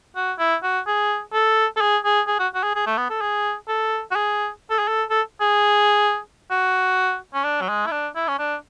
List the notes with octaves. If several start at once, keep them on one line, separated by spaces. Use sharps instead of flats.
F#4
E4
F#4
G#4
A4
A4
G#4
G#4
G#4
F#4
F#4
G#4
G#4
A3
B3
A4
G#4
A4
F#4
G#4
A4
G#4
A4
A4
G#4
F#4
C#4
D4
F#3
G#3
E4
D4
E4
C#4
D4